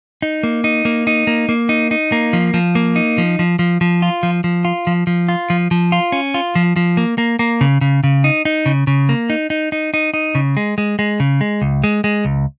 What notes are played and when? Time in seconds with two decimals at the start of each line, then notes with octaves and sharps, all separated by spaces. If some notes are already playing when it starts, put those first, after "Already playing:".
0.22 D#4
0.43 A#3
0.64 D#4
0.85 A#3
1.07 D#4
1.27 A#3
1.49 A#3
1.69 D#4
1.91 D#4
2.12 A#3
2.33 F3
2.54 F3
2.75 A#3
2.96 D#4
3.18 F3
3.39 F3
3.59 F3
3.81 F3
4.02 F4
4.23 F3
4.44 F3
4.65 F4
4.87 F3
5.07 F3
5.29 F4
5.50 F3
5.71 F3
5.92 F4
6.12 C#4
6.34 F4
6.55 F3
6.76 F3
6.97 A#3
7.18 A#3
7.39 A#3
7.61 C#3
7.81 C#3
8.04 C#3
8.24 D#4
8.45 D#4
8.66 C#3
8.87 C#3
9.09 A#3
9.30 D#4
9.50 D#4
9.72 D#4
9.94 D#4
10.14 D#4
10.35 C#3
10.57 G#3
10.78 G#3
10.99 G#3
11.20 C#3
11.41 G#3
11.62 C#2
11.84 G#3
12.04 G#3
12.25 C#2